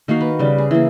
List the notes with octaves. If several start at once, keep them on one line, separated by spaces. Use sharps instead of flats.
D#3 A#3 F#4 F5
B4
C#3 G3
G#4
E3 A#3